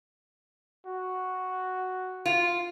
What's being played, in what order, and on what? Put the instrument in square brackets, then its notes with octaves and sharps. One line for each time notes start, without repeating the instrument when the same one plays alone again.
[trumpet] F#4
[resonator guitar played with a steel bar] F4